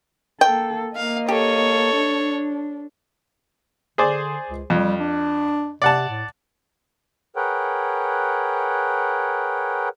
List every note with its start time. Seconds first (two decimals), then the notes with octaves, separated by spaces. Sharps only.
0.41 A#3 A4 G5
0.96 A#3 D#5 F5
1.28 G4 A4 C#5
1.94 D4
3.98 D3 G#4 C5 D5
4.49 C#2
4.70 F2 G3
5.00 D4
5.82 C3 D5 F#5 A5
6.09 A2
7.36 G#4 A#4 B4 C#5 F#5 G5